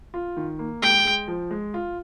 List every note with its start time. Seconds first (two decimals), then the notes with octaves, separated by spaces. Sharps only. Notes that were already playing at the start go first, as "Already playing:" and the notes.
0.14 F4
0.37 D#3
0.59 A#3
0.82 G#3 G5
1.05 G#3
1.28 F3
1.51 G#3
1.74 F4